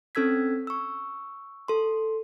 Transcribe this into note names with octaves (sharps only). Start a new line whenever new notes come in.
C4 C#4 A4 E6 G#6 B6
C#6 E6
A4 C6